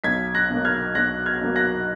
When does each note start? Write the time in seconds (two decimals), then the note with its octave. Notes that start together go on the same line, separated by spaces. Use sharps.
0.04 B1 G#6 B6
0.35 F#6 A#6
0.49 B2 F#3 A#3
0.65 F6 G#6
0.95 B1 F#6 A#6
1.26 F6 G#6
1.41 B2 F#3 A#3
1.56 F#6 A#6